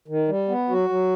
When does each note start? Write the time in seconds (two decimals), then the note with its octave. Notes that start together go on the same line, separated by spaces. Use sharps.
0.08 D#3
0.28 G3
0.49 B3
0.69 F#3 F#4
0.89 F#3